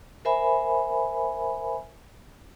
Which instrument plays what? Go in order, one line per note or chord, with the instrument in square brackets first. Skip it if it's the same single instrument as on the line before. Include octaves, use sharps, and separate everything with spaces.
[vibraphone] A#4 C5 E5 G#5 B5